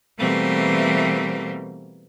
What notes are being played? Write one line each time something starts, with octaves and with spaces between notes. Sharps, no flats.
B2 E3 G3 A3 A#3 C4